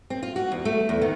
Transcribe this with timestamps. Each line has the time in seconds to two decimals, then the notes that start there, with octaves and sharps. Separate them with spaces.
0.10 C4
0.23 F4
0.36 F#4
0.52 E2
0.65 A3
0.89 E2
1.02 D#3